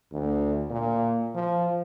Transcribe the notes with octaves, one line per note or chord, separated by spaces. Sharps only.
D2
A#2
F3